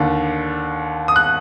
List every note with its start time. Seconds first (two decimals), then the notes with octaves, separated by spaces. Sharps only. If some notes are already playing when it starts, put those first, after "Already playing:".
Already playing: D#2 D3
1.08 D#6
1.16 F#6